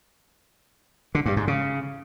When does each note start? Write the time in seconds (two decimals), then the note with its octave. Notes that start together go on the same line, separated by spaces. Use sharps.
1.15 D3
1.26 G2
1.37 G#2
1.48 C#3